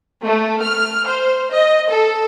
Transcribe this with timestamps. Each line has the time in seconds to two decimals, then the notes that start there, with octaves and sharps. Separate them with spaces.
0.24 A3
0.62 F6
1.07 C5
1.52 D#5
1.89 A4